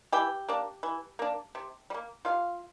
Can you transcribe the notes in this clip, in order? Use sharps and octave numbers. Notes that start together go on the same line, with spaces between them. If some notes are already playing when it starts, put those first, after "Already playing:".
E3 G4 G5
A#3 D4
E3
A#3 D4
C3
G3
A#3
C3 F4 F5